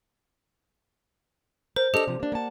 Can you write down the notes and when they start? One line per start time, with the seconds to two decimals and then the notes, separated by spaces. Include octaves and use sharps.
1.76 A#4 C5
1.94 D4 G4 A4 D#5 F7
2.07 C3 F3
2.20 A#3 D4
2.32 A#3 F#5 A5